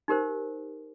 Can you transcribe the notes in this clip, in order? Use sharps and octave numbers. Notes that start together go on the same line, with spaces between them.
D#4 G4 A#4 C5